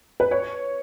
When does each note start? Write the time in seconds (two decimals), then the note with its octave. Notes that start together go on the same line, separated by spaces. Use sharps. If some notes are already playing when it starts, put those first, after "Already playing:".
0.20 B4
0.31 C#5